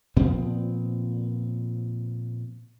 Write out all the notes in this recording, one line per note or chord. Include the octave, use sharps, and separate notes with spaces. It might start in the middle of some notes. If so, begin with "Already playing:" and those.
A#2 F3 B3 C4